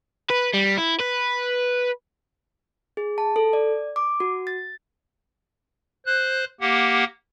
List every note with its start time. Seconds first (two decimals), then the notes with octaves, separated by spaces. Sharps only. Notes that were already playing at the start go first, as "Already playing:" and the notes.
0.30 B4
0.54 G3
0.78 E4
1.00 B4
2.97 G#4
3.18 A5
3.36 A4
3.53 D5
3.96 D6
4.20 F#4
4.47 A6
6.06 C5 F#6
6.61 A#3 G4 F#5